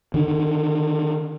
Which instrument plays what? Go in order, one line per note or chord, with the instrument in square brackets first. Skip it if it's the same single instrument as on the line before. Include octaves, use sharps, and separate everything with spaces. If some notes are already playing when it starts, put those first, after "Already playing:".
[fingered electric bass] D3 D#3